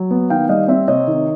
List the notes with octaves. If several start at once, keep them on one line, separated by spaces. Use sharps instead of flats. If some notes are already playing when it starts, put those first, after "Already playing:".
Already playing: F#3
B3
D#3 F5 G5
G3 D#5 F5
C4 D5 E5
C3 C#5 D#5
D#3